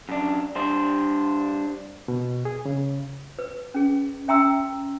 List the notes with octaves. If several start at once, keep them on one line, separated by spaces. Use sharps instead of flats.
F#2 D4
G3 D4 C5
B2
G#4
C#3
B4
C#4 G#4
C#4 E5 G5 A#5 C6 E6